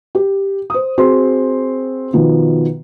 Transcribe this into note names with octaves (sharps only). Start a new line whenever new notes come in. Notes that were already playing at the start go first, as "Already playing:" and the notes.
G4
C5 D#6
C4 F#4 G#4 C6
B2 D#3 F3 B3